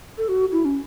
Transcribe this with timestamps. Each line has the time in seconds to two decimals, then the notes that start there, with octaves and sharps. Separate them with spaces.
0.18 A4
0.28 F#4
0.52 E4
0.65 C#4